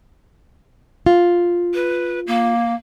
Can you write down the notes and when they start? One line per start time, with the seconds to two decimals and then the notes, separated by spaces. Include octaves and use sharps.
1.06 F4
1.74 B4
2.27 A#3